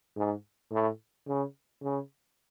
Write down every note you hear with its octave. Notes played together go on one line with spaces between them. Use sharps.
G#2
A2
C#3
C#3